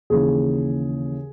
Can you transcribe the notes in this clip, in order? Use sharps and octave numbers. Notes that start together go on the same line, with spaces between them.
D#2 C#3 E3 G#4